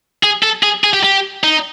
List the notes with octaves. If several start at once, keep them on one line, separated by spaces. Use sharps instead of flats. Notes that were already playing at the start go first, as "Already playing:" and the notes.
G#4
A4
G#4
G#4
G4
G4
D#4